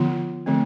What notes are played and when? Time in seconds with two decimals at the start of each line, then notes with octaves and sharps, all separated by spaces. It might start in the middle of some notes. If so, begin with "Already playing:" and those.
Already playing: D3 F3 B3 F4
0.46 D3 F3 A3 C4